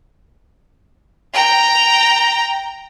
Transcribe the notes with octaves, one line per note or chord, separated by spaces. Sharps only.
G5 A#5